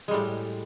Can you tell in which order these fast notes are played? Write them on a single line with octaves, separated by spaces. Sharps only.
G#3 G3 A2